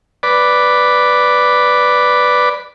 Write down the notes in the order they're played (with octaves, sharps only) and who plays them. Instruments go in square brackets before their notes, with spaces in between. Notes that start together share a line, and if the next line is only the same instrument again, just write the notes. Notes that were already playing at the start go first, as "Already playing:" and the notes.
[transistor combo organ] B4 D5